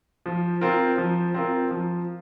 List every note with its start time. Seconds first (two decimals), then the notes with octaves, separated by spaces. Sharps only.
0.26 F3
0.61 C4 F4 A#4
0.98 F3
1.34 C4 F4 A#4
1.71 F3